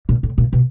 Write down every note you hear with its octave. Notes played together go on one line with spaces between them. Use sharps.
A#2
A2
A#2
B2